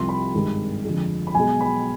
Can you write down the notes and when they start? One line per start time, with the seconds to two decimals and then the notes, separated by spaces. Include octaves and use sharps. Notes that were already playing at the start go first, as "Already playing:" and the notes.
Already playing: C2 C3 F3 C6
0.09 B5
0.34 G#1 G2 D#3 G#3
0.85 F2 D3 F3 G#3
1.27 B5
1.35 B1 B2 G#3 G#5
1.61 B5